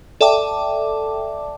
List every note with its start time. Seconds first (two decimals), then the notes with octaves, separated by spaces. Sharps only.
0.21 A4 D5 E5 G5 A5 D6